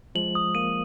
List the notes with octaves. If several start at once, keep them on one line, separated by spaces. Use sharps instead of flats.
F3 G#3 F#7
D#6
A#3 D#7